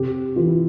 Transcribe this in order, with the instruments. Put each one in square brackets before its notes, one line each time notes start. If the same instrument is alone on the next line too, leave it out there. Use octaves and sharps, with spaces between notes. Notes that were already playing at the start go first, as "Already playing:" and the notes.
Already playing: [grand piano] C3 G4
E3 F4
E4